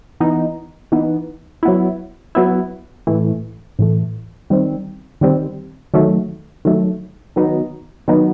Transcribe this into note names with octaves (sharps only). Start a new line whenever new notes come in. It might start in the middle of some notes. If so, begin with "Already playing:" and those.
E3 B3 D#4
E3 B3 D#4
F#3 B3 E4
F#3 B3 E4
A2 E3 A3
A2 E3 A3
D#3 G3 C4
D#3 G3 C4
D#3 F#3 A3
D#3 F#3 A3
D#3 F#3 B3 D#4
D#3 F#3 B3 D#4